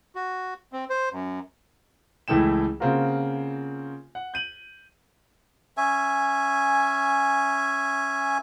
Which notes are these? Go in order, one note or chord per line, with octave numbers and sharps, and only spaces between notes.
F#4
C4
C5
F#2
C#2 E3 A3 E4 G5 E7
C#3 A#3 C4 F4 F#4 A#4
F#5
G6 D#7 F#7
C#4 E5 G#5